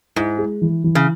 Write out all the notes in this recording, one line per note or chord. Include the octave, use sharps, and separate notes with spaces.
G#2 E4
G#3
E3
E3
C#3